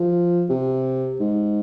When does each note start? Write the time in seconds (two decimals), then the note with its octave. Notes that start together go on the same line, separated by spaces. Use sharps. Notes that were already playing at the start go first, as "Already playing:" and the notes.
Already playing: F3
0.49 C3
1.20 G#2